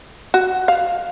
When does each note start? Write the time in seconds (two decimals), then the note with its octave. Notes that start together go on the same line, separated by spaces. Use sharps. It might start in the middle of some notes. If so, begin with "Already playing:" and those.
0.34 F#4
0.68 F5